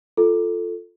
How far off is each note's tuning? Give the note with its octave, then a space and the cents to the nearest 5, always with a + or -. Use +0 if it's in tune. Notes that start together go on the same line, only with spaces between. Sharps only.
F4 +0 A4 +0